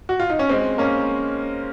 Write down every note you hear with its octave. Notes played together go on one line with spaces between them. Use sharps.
F#4
F4
D#4
C#4
G#3 C4
A#3 C#4